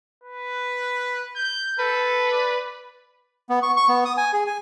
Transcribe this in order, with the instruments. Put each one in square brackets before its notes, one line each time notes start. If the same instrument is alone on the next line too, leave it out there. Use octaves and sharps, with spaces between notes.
[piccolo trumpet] B4
G6
[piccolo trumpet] A4 [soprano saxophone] B4
[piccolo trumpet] D5
[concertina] B3
C#6
C#6
B3
D#6
G#5
G#4
G#5